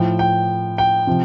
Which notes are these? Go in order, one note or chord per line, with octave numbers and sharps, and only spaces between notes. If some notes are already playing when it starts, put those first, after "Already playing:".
Already playing: A2 F3 G5
G5
G5
C3 F3